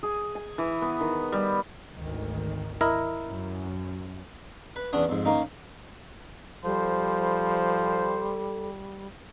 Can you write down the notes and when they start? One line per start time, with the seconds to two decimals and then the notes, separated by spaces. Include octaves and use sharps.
0.03 G#4
0.35 G#5
0.58 E3
0.82 B3
1.00 D#3
1.32 G3
1.93 G#1 D2 D#3
2.81 E4 A#4 D#5
3.26 F#2
4.76 B4
4.93 E2 B3 C#4 D4 D#6
5.09 F2 G#2
5.25 D#3 A#3 C#4 D#4
6.64 F3 G3 A4 C5